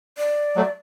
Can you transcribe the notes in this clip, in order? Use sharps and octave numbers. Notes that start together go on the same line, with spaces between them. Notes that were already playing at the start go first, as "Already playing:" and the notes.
D5
F#3 A3